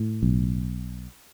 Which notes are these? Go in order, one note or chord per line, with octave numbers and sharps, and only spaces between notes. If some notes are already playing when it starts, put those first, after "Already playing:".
Already playing: A2
B1